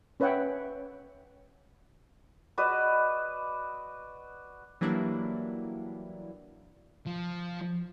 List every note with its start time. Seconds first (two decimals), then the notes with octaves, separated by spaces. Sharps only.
0.20 C#4 B4 C#5 E5 F#5 G5
2.58 F#4 B4 D5 D#5
4.81 E3 F#3 G3 A#3 D4 E4
7.06 F3